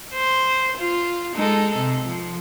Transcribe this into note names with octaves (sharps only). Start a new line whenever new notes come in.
C5
F4
G#3 D#4 A4
C3
F3